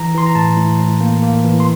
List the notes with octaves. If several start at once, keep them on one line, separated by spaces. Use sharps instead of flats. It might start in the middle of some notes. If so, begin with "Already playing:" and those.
Already playing: E3 A#5
E3 C6
A#5
A2 A5
A2
A2
A#3
A#3
E3
C6